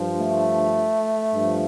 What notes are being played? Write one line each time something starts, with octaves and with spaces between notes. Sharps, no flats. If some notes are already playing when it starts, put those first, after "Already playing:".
Already playing: G2 F3
A3
G2 F3